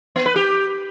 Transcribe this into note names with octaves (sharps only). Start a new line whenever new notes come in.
B3
B4
G4